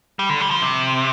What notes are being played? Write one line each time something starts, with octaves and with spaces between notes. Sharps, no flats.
G3
D3
G3
F3
C3